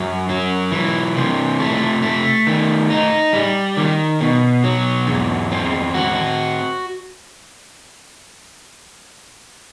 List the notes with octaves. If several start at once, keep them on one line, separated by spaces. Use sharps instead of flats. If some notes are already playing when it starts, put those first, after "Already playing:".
Already playing: F#2 F#3
F#3
E3
C3
A3
A3
D#3
D#4
G3
D#3
B2
F#3
E2
C4
F#4